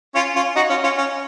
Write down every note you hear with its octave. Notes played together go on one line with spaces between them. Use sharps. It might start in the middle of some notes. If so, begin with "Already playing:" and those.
C#4 F4
C#4 F4
D#4 F#4
C#4 F4
C#4 F4
C#4